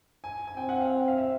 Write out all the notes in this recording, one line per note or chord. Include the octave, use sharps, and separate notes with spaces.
G#5
G#5
C4 G5
F#5
F5
F5
E5